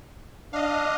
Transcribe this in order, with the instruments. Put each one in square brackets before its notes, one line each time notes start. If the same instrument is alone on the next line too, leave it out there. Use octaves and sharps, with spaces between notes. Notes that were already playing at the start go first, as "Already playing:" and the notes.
[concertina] D4 [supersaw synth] D#5 F5